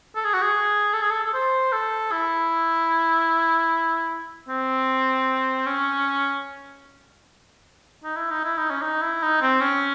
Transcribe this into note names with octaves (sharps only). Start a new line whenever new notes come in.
A4
G#4
F#4
G#4
A4
G#4
A4
A4
C5
A4
E4
C4
C#4
D#4
E4
D#4
E4
D#4
C#4
D#4
E4
D#4
C4
C#4